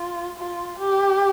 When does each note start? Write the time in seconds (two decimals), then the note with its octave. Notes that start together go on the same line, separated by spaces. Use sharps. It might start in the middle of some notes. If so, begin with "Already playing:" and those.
Already playing: F4
0.38 F4
0.79 G4